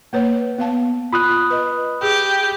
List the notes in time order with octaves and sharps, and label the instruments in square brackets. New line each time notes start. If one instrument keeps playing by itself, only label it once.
[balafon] A#3 B4 C#5
B3 F5 A5
[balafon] F4 [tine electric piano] B5 D#6 F#6
[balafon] B4 D#5
[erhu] G4 [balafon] G#4